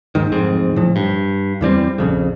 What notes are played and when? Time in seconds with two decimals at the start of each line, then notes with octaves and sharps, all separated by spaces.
0.15 D#2 G#2 D#3
0.32 D1 F2 G#2 C4
0.76 A2 F3
0.96 G2
1.61 E2 E3 G3 C4
1.98 A#1 F2 C#3